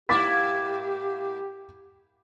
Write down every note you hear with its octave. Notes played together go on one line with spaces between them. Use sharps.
G#2 A#3 E4 G4 D6 A6 B6